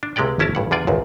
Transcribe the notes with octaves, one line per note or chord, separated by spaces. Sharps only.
D4
C#2 C3 G#3 G4 D5 G5
G#1 C#4 E4 A#4 A5 A#5
A1 G2 F#5
E2 D3 F4 D5 G#5
G#1 C#2 F#2